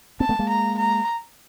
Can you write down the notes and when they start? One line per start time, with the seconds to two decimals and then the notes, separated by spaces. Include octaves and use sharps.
0.20 A#3 C4 A5
0.29 A3 B3
0.39 G#3 A#3
0.49 A#5
0.78 A#5